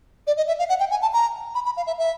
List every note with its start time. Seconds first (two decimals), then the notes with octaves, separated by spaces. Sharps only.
0.27 D5
0.37 D#5
0.48 E5
0.59 F5
0.69 F#5
0.80 G5
0.91 G#5
1.02 A5
1.13 A#5
1.55 B5
1.66 B5
1.77 F5
1.87 E5
1.98 E5